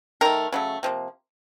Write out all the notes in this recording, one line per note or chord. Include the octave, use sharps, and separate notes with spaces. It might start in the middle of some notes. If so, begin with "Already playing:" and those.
D#3 A3 A#4
C#3 F#3 A3
C3 F3 A#3